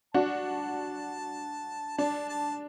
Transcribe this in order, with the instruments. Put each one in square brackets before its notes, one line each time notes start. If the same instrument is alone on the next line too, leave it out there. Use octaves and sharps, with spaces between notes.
[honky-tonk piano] D4 F#4 [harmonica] A5
[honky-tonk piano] D4 [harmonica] A5
[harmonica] A5